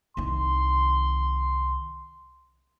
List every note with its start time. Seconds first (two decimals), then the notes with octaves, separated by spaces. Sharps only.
0.17 C2 D#3 C6